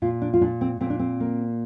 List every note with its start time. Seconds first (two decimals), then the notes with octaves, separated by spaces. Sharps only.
0.02 A#2 F4
0.22 D4
0.34 F4
0.41 A#2 D4
0.61 C4
0.81 A#2 C4
0.90 D4
0.99 C4
1.20 A#3